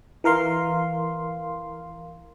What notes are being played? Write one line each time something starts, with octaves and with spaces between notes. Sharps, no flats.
E3 A#4 F5 C6